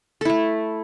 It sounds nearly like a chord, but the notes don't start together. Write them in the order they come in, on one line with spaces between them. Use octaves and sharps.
A4 E4 A3